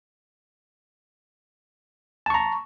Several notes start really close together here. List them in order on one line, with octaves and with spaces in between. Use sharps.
A5 C#6 A#5